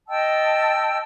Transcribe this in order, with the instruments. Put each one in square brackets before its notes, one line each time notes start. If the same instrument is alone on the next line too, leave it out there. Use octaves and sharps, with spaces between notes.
[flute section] D#5 G5 A5 E6